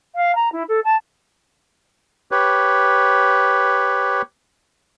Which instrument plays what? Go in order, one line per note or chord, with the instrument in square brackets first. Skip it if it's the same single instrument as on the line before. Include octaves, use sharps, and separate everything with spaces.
[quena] F5
A#5
E4
A4
A5
[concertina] G4 B4 C#5